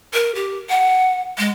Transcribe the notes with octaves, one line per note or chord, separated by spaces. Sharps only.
A#4
G4
F#5
G#3